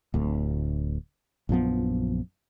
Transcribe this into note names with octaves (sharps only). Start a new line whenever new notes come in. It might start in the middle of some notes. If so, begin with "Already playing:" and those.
D1 D2
A#1 F#2 F3 B3